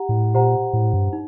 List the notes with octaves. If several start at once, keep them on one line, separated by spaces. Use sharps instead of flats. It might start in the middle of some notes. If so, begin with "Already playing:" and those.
Already playing: G4 F#5 A#5
A2
A#2 G4 C5 F#5 A#5
A2
G2
D#4